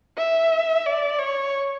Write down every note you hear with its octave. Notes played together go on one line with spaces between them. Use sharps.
E5
D5
C#5